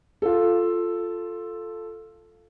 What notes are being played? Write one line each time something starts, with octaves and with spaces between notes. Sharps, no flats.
F4 A4